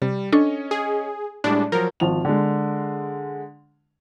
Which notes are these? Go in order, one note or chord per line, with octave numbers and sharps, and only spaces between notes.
C3 G3
C#4 D4 A4 C#5 D#5 C#6
G#4
A2 G3 G#3 D4
F3 F#3 A#4
G#1 F3 F7
D3 G#3